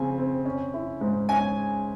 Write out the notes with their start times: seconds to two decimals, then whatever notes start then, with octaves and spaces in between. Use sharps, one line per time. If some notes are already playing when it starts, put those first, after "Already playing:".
Already playing: C#3 F3 C4 G#5
0.18 C4
0.45 C#4
0.74 E4
1.01 G#2
1.29 C#4 G#5